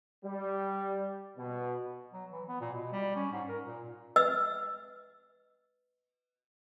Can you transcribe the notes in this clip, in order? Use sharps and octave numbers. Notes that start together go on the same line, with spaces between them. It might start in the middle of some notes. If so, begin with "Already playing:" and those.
G3
B2
F#3
E3
B3
A#2
B2
G3
C#4
G#2
A#4
A#2
B4 D#5 E6